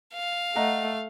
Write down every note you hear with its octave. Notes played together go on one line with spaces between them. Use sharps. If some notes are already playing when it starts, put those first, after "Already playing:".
F5
A3 D#5 F#5 A#5